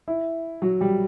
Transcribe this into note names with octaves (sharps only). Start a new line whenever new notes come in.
E4
F#3 F#4
G3 G4